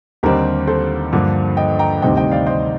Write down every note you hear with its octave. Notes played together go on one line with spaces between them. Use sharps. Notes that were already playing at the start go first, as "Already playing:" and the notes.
D#2 D3 G3 C4 D#4 G4 A#4
A4 C5
G2 D3 F3 A#3 D4
D#5 G5
G5 A#5
D2 C3 D#3 G3 C4 D#5 G5
D#5 G5
D5 F5
C5 D#5